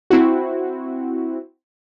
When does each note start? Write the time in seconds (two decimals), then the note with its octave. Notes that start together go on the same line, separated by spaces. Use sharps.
0.10 C4 E4 F#4